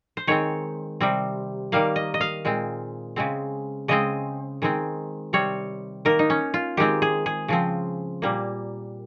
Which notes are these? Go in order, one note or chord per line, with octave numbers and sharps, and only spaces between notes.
C5
D#3 G#3 C4 C#5
C3 G3 C4
D#3 G3 A#3 F5
D#5
D#5
F5
A#2 G#3 C4
C#3 G#3 C4
C#3 G#3 C4 D#5
D#3 G#3 C4
C3 G3 C4 C#5
D#3 A#3 A#4
D#4
C#4
F4
D#3 G#3 C4 G4
G#4
G#4
C#3 F3 C4
A#2 G3 A#3